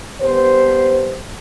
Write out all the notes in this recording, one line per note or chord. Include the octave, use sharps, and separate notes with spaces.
G2 B3 C5